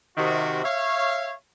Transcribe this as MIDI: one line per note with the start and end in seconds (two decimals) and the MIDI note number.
0.17 0.62 48
0.17 0.62 51
0.17 0.62 66
0.64 1.32 73
0.64 1.32 76
0.64 1.32 77